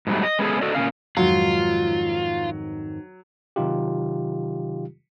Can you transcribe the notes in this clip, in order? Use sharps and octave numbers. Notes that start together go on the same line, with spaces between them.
G#2 B2 F#3 G3 A3
D#5
G#3 B3 C#4 F4 G#4 A4
F#4 A4 D5 D#5
A#2 F3 C#4 F5
F2 G#2 D#3 F#3 F4
C3 D#3 F#3 D#4 F4 G4